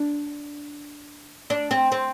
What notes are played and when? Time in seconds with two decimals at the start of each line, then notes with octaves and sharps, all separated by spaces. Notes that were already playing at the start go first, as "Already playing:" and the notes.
Already playing: D4
1.50 D4
1.71 C4
1.92 C4